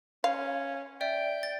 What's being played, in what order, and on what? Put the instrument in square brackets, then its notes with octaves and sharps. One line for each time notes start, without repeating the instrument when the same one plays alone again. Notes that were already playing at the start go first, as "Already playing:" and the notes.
[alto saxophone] C#4 [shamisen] F5
[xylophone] D5 E5 [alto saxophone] G5
[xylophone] A6